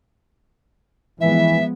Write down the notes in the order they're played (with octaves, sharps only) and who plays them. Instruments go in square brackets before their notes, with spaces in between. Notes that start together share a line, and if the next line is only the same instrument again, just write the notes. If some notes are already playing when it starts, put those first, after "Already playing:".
[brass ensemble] E3 [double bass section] F3 G#3 B3 [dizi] E5